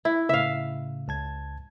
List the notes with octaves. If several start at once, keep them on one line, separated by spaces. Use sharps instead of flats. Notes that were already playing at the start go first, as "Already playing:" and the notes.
E4
A2 C#3 E5 F5
C#2 A5 G#6